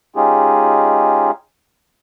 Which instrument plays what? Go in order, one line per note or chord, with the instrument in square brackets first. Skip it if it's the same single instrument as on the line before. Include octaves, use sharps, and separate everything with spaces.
[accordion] G#3 C#4 D#4 F4 G4 G#4